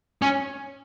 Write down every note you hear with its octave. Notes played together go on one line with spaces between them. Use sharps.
C#4